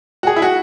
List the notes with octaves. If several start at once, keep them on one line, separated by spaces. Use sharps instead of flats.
F#4
G#4
E4
F#4